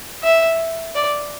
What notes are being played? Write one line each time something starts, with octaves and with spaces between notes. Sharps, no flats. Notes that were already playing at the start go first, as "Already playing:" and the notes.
E5
D5